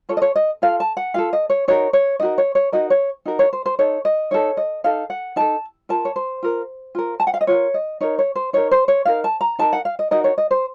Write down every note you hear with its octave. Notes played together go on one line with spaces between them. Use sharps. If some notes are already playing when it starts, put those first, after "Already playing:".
F4 A4 C#5
D#5
C#5
D#5
F4 A4 F5
A5
F#5
F4 A4 F5
D#5
C#5
D#4 F#4 A#4 C#5
C#5
D#4 F#4 A#4 D#5
C#5
C#5
D#4 F#4 A#4 D#5
C#5
D#4 F#4 A#4
C#5
C5
C5
D#4 A4 C#5
D#5
D#4 A4 C#5
D#5
D#4 A4 F5
F#5
D#4 A4 A5
F4 A#4 A5
C#5
C5
F4 A#4
F4 A#4
A5
F#5
F5
D#5
F4 A#4 C#5
D#5
D#4 A#4 C#5
C#5
C5
D#4 A#4 C#5
C5
C#5
D#4 A#4 F5
A5
A#5
D#4 A#4 A5
F#5
F5
D#5
D#4 F#4 A#4 D#5
C#5
D#5
C5